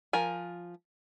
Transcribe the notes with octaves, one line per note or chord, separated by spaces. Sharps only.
F3 A#4 G#5